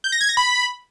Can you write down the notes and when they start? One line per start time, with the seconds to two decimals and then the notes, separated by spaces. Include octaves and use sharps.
0.04 G6
0.12 A#6
0.21 G#6
0.29 A#6
0.37 B5